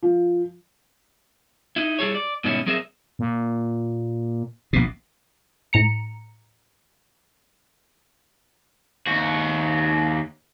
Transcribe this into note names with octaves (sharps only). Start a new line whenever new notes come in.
F3
D#4 E4
G3 E4 G#4 A4 C#5
D5
G#2 B2 D#3 G3 C#4 E4
F#3 C4 G#4 A#4 C5 E5
A#2
A#1 B2
A2 A#5 C#7
D#2 F#4